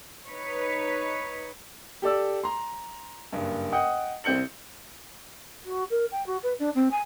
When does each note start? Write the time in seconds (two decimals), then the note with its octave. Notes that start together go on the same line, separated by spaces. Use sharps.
0.28 D#4 B4 C#5
2.02 G4 A4 D5 E6
2.44 A#5 C6
3.33 F#1 G2
3.72 D#5 F#5 G5 D#6
4.24 C2 C4 G6 C#7 F#7
5.65 F#4
5.90 A#4
6.11 G5
6.26 F#4
6.43 B4
6.59 D4
6.75 C4
6.91 G#5